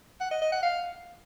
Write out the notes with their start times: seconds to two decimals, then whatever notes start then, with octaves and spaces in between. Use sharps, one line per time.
0.21 F#5
0.31 D#5
0.41 D#5
0.52 F#5
0.62 F5